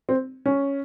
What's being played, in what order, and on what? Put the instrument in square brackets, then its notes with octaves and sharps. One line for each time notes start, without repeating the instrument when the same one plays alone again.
[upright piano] C4
C#4